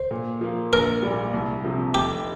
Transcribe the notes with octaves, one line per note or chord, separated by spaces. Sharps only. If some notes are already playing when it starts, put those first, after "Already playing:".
Already playing: C5
A#2
F3 A#3
A#1 A#4
A#2 G3
C2
C3 F3
F1 G4